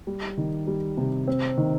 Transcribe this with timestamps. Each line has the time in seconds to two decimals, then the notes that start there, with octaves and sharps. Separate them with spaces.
0.07 G3
0.37 D#3
0.67 G3
0.97 C3
1.28 C4
1.57 D#3